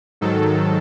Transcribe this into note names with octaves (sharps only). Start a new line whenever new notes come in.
G#2 D#3 F#3 A4